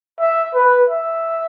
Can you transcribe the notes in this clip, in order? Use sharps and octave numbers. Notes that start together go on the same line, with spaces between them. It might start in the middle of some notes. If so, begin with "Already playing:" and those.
E5
B4
E5